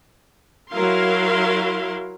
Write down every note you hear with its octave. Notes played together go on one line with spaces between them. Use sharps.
F#3 E4 A#4 F5 C6